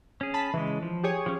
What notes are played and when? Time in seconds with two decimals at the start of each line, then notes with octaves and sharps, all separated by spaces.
0.21 C#4 G#4
0.34 A5 B5
0.54 C#3 E3 G#3
0.83 F3
1.03 G4 G#4 C#5
1.26 F3 C#4